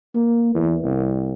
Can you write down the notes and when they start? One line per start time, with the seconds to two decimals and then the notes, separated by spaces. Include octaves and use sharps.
0.15 A#3
0.55 E2
0.84 C2